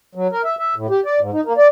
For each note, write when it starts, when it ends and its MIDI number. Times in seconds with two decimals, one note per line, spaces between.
0.15 0.27 54
0.33 0.42 70
0.45 0.56 76
0.59 0.75 76
0.76 0.87 45
0.90 1.00 67
1.06 1.20 74
1.20 1.30 44
1.33 1.41 63
1.45 1.53 58
1.58 1.68 74